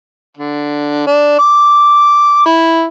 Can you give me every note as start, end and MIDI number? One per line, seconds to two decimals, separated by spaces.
0.37 1.05 50
1.07 1.38 62
1.39 2.45 86
2.46 2.86 64